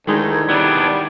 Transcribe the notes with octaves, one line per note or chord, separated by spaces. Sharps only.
D2 D#3 G#3 D#4 E4 A#4 G#6
G3 B3 D4